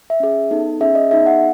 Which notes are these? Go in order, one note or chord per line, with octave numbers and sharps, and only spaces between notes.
E5
C#4 G#4
B3 D#4 A4
C#4 G#4 E5
D#5
B3 D#4 G#4 E5
F#5